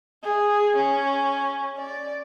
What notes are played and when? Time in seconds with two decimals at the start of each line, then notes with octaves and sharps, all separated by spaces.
0.24 G#4
0.76 C#4
1.77 D5